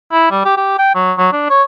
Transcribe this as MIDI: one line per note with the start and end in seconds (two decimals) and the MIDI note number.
0.12 0.30 64
0.31 0.43 55
0.45 0.57 67
0.57 0.78 67
0.79 0.92 79
0.95 1.13 54
1.18 1.28 54
1.32 1.47 62
1.50 1.63 73